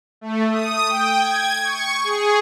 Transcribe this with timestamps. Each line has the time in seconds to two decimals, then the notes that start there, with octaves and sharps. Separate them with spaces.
0.21 A3
0.51 D#6
0.89 G5
1.19 G#6
1.64 C#6
2.04 G#4